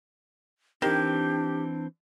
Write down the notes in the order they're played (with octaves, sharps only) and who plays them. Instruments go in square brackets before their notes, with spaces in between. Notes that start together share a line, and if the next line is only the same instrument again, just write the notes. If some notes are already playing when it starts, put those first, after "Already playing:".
[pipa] D#3 [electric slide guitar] E3 C4 [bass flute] D4 [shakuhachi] G4